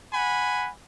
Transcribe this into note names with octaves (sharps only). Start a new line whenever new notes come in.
F#5 G#5 B5